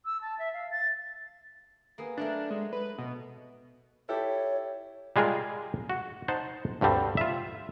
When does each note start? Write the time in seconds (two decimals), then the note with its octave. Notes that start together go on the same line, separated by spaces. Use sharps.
0.05 E6
0.21 A5
0.39 E5
0.53 F5
0.71 A6
1.98 A#3 B3 G#4
2.17 F#3 A3 D4 A#4
2.50 G#3
2.73 B4
2.98 B2
4.09 E4 G4 A4 C#5
5.16 G3 G#3 F4 G#4 A#4
5.90 F#4
6.28 D#4 C5 F#5 A5
6.81 D2 G2 D3 G3 C4
7.17 F4 E5